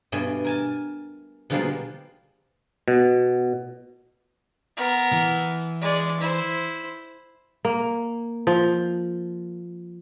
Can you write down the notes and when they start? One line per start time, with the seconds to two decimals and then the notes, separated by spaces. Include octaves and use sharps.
0.12 G2 B2 A3 D5 G#5
0.45 A#4 G#5 A5
1.50 B2 D3 F3 G3 G#3 A#3
2.88 B2
4.77 B3 A#4
5.13 E3
5.82 G#3 D5
6.21 E4 C5
7.65 A#3
8.47 F3